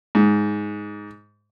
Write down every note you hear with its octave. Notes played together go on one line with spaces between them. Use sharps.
G#2